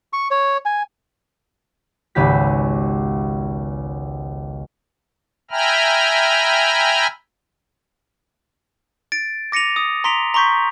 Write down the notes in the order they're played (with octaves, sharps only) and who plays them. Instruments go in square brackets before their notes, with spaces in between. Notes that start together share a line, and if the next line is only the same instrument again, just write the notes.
[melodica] C#6
C#5
G#5
[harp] G#1 C#2 B3 G4 B6
[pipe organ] E5 G5 G#5 A#5 B5 F6
[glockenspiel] A6 D7
D6 A#6 C#7 D#7 F7
D#6
A#5 C6 B6 D7 F7
A#5 C6 C#6 G6 B6